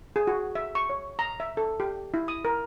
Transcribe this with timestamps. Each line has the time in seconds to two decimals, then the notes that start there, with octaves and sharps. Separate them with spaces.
0.16 G#4
0.27 F#4
0.55 E5
0.75 C#6
0.90 C#5
1.19 A#5
1.40 E5
1.57 A4
1.80 G4
2.14 E4
2.28 D#6
2.45 A#4